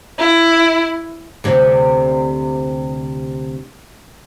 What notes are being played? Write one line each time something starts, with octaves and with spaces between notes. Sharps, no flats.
E4
D2 C3